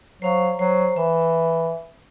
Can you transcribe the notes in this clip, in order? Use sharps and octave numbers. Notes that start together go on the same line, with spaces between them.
F#3 C5 F5 C#6
F#3 C5
E3 E5